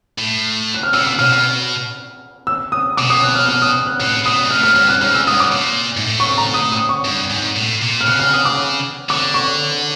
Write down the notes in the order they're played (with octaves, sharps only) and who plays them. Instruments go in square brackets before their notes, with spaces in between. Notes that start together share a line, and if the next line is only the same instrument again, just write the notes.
[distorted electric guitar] A2
[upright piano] F#6
F6
[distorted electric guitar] A#2 [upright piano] E6
[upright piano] E6
[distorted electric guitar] B2 [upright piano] F6
[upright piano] F6
E6
D#6
[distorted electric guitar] B2 [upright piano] D6
[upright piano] D#6
F#6
F6
F6
D#6
F#6
[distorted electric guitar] A2 [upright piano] F#6
[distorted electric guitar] B2 [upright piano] D#6
[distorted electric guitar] G#2
[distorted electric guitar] A2 [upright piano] F6
[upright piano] F6
[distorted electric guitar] G2 [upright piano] F6
[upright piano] F#6
[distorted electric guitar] G#2 [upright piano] F6
[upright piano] E6
[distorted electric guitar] G2 [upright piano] D#6
[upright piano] D6
[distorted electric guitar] A#2
G#2
A2
[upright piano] C#6
A#5
D#6
D#6
C#6
[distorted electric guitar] G2
G#2
A2
A#2
[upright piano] F6
[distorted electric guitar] C#3 [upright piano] F#6
[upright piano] F6
D#6
D6
[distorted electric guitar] D3 [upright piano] D6
[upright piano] C#6